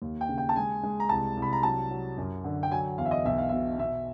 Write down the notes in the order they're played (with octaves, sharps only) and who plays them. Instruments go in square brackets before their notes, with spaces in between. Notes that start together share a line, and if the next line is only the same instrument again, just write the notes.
[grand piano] D#2
G5
C#3
G5
A5
G#3 G#5
G#3
A#5
C2 A5
C2
B5
A#5
F#3 A5
F#3
F#2
D3
G5
F#3 G#5
E2 F5
E5
D#5
B1 E5
F5
B2 E5
B2 E5